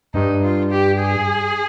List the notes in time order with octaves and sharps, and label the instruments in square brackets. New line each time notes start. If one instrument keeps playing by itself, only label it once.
[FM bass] G2 [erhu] D#4
[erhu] F4
G4
G#4